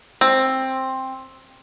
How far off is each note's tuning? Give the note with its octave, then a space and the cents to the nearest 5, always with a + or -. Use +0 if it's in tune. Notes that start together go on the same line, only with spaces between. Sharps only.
C4 +10